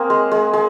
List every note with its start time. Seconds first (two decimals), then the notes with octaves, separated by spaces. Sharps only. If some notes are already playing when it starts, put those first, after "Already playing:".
Already playing: A#3 C4 G#4
0.10 G#3
0.31 G#3
0.53 G#3